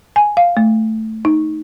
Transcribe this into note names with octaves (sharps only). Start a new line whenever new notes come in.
G#5
F5
A3
D#4